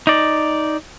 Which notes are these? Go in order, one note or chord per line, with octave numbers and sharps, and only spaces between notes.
D#4 D5